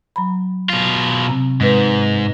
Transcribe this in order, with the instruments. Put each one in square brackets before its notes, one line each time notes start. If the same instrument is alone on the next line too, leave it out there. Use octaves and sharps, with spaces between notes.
[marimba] F#3 A#5 B5
[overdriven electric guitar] B2 F4
[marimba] C3 C4 A#5
[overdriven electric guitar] G#2 [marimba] G#3 B4